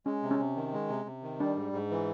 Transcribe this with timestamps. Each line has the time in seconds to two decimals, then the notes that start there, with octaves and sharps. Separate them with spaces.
0.06 G#3 C#4
0.23 C3
0.31 C#4
0.40 C3
0.56 D#3
0.73 G#3
0.89 C3
1.06 C3
1.23 D#3
1.40 G3 D4
1.56 G#2
1.73 G#2
1.90 E3